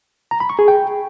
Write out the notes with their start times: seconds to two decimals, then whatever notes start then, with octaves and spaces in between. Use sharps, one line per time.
0.31 A#5
0.40 B5
0.50 C#6
0.59 G#4
0.68 G5